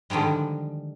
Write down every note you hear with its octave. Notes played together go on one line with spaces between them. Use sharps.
D3 D#3 F3 G3 G#3